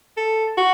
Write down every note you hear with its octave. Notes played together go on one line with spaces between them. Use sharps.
A4
F#4